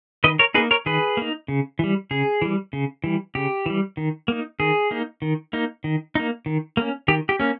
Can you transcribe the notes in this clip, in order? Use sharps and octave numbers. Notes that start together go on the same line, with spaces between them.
D#3 B4 D#5
A#4 C#5
A#3 D#4 G#4 B4
A#4 C#5
D#3 G#4 B4
A#3 D#4
C#3
E3 G3
C#3 G#4
E3 G3
C#3
E3 G3
C#3 G4
E3 G3
D#3
A#3 D#4
D#3 G#4
A#3 D#4
D#3
A#3 D#4
D#3
A#3 D#4
D#3
A#3 C#4
D#3 G4
G4
A#3 C#4